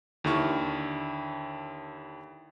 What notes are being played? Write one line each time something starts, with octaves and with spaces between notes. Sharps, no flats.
D#2 D3 E4 C#6 F6